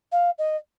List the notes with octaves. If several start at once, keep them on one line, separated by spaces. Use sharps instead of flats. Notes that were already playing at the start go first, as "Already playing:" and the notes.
F5
D#5